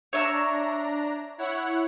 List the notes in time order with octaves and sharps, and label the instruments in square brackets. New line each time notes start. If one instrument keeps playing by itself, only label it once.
[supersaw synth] D4 A#5 [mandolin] C#5 E5 C#6
[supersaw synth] E4 C#5 F#5